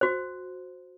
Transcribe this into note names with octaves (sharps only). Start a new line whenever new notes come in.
F#4 C5